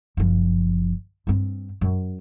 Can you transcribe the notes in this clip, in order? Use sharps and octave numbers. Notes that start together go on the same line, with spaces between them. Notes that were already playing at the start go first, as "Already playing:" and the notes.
F#1 F3
G2 C4
F#2